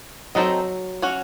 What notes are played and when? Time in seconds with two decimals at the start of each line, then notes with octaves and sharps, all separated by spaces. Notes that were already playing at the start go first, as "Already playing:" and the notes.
0.35 F#3 C4 D#4 A4 D#5
1.02 C#4 F#4 C#5